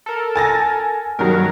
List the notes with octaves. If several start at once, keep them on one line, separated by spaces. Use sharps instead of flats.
A4 A#4
G#5 A6 A#6
G2 D#3 F#3 A#4